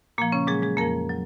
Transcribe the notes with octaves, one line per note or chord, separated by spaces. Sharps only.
A#2 F3 A#3
C#3 C#4
A#2 F#3 G#3 G#4
G#3 G#4
F2 F3 A#3 A#4
F#3